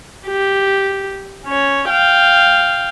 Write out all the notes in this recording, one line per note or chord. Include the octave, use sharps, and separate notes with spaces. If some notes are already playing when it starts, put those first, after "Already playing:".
G4
C#4 C#5
F5 G5